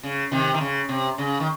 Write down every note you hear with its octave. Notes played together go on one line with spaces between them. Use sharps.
C#3
C3 D#3
D#3
C#3
C3
C#3
D#3